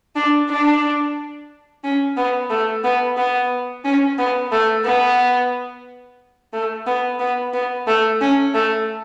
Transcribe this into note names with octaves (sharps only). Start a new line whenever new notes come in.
D4
D4
C#4
B3
A3
B3
B3
C#4
B3
A3
B3
A3
B3
B3
B3
A3
C#4
A3